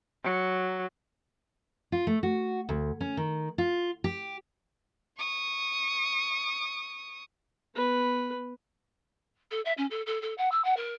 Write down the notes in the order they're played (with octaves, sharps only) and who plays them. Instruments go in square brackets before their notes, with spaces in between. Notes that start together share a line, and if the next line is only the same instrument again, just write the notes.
[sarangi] F#3
[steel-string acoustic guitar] F4
A3
F#4
D2
C#4
D#3
F4
G4
[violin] C#6 D#6
[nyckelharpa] B3 B4
[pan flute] A4
E5
C#4
A4
A4
A4
F#5
E6
F#5
A#4